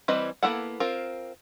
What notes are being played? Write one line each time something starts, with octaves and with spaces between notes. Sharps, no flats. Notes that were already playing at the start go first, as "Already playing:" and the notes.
E3 G3 C4 B4 D#5
A#3 B3 E4 A4 F#5
C4 F4 A#4